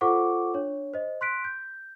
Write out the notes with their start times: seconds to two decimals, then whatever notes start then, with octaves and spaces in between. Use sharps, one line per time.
0.01 F4 A4 C5 F#5 C#6 D6
0.54 D4 C#5
0.94 C5 D#5
1.21 C6 F#6 B6 D7
1.44 G6